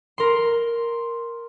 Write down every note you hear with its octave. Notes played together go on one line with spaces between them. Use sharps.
A#4 C6